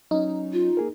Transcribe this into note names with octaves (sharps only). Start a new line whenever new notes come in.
F#3 C#4 D#4
F4
A#3 G#4 A#4